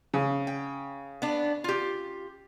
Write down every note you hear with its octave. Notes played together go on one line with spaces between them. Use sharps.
C#3
G5
B3 D4
F4 G4